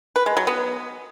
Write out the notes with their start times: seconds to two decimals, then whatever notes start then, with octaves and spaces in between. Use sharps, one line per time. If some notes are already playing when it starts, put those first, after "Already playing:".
0.16 B4
0.26 G#3
0.37 F#3
0.47 B3